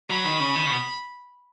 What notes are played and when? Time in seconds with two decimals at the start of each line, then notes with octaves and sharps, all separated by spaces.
0.09 F#3 B5
0.24 D#3
0.40 C#3
0.55 D#3
0.66 C#3
0.70 B2